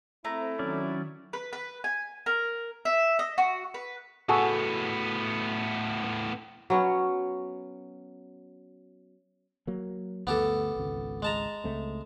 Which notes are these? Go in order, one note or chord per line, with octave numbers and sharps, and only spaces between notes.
A3 C4 E4 A#5
D#3 F#3 C#4 D5
B4
B4
G#5
A#4
E5
D#5
F#4
B4
A2 B3 F#4 G#4 A4
F#3 B3 C#4
F#3 A#3
D2 G2 B3 G4 A4
G#1 C#2
G#3 A5 A#5
C#2 A3 C4